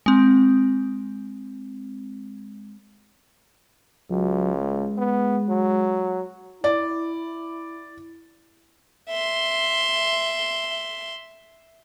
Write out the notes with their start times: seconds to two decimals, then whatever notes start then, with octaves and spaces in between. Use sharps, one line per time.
0.06 G#3 C4
4.10 C#2 F#3
4.58 G#3
4.98 B3
5.49 F#3
6.64 E4 D5
9.09 E5 C6